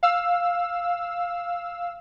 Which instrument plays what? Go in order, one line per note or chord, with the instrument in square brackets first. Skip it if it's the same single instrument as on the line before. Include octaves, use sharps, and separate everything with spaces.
[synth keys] F5 E6